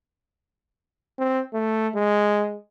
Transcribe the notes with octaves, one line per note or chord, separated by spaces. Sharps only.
C4
A3
G#3